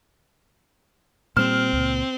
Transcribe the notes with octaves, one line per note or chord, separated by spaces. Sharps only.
A#2 G3 C4 F6 E7
C#2 A#2